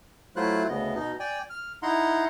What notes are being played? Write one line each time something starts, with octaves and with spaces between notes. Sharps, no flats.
F#3 A3 E4 F4 C5 F#6
D2 C#3 B3 D#5
B2 D#4 D#5
D5 G5 G#5
F6
D#4 E4 F#5 A#5 C6